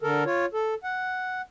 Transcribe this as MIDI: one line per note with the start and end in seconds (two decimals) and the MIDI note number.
0.02 0.24 50
0.02 0.24 69
0.02 0.24 70
0.26 0.46 65
0.26 0.46 73
0.54 0.74 69
0.84 1.41 78